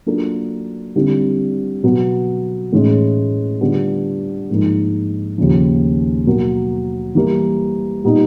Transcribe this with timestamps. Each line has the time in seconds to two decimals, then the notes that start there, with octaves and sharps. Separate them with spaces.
0.06 F#3 A#3 D4 F4 A4
0.96 D3 G3 C4 E4
1.83 B2 F#3 B3
2.72 A2 E3 G#3 C#4
3.61 D3 G3 B3 D4 F4
4.50 G#2 F3 A#3 D#4
5.38 D#2 C#3 F3
6.26 B2 F#3 A#3
7.15 E3 G3 A#3
8.04 A#2 G3 B3 D#4